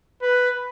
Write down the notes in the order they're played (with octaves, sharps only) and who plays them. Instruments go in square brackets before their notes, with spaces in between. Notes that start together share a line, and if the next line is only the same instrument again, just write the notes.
[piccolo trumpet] B4